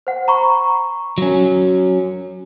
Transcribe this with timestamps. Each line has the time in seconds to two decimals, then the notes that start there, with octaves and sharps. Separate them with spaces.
0.07 C5 F#5
0.28 A#5 B5 C#6
1.18 F#3 C#4